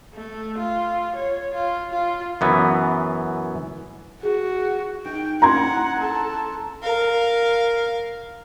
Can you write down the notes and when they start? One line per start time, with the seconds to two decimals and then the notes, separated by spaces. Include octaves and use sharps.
0.14 A3
0.58 F4
1.16 C#5
1.55 F4
1.92 F4
2.41 F#2 E3 B3
4.23 F#4 G#4
5.05 D#4 G5
5.42 A#3 C#4 E4 F#5 A#5 C6 G#6
5.99 A4
6.82 A#4 F5